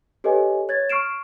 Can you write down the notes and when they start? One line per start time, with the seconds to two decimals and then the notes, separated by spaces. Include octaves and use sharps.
0.24 G4 A4 B4 C#5 D#5 G#5
0.69 C#5 G#6 A6
0.90 C#6 F6 C7 D7 E7